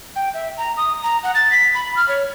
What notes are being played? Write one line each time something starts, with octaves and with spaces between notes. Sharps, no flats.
G5
E5
A#5
D#6
A#5
F#5
A6
B6
B5
F6
C#5